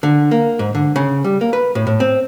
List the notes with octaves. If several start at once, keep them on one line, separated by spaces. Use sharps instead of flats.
D3
A#3
G#2
D3
C#3
G3
A#3
B4
A2
A2
C4